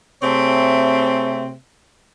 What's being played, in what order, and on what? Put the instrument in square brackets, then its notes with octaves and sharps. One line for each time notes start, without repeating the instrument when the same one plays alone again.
[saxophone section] C3 A3 C4 G#4 C#5 E5